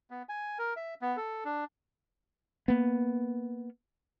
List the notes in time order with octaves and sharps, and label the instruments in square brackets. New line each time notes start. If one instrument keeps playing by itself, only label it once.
[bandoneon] B3
G#5
A#4
E5
B3
A4
D4
[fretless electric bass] A#3 B3